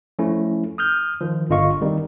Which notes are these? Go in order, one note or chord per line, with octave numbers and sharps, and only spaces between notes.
F3 A3 C#4 E4
D#6 F6 G6
D#3 F3
G1 D3 F4 D#5 F5 C#6
D#3 G3 C4 D#4